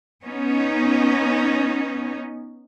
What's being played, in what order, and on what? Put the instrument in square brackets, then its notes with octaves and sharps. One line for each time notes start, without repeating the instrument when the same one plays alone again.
[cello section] B3 C#4 D#4